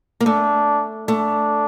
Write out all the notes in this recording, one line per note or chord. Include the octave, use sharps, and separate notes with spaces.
A#3
A3 D4
A3 D4